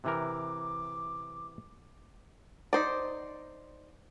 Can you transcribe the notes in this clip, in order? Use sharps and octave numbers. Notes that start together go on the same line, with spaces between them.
C3 E3 A#4 D6
D#4 C5 D5